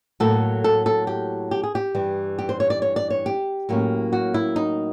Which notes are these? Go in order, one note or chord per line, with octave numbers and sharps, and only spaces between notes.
A2 F#3 A#3 A4
A4
A4
G4
G4
G#4
G4
G2 E3 G3
G4
C5
C#5
D5
C#5
D5
C#5
G4
A2 F#3 A#3 C#4
F#4
E4
D#4